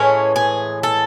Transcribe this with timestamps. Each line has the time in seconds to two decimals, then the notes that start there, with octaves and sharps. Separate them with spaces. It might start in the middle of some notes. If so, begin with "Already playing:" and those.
Already playing: A2 E3 G#3 C#4
0.36 G#4
0.83 A4